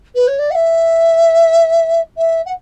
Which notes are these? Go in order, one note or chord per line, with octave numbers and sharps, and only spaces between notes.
B4
C#5
D5
F#5
E5
E5
F#5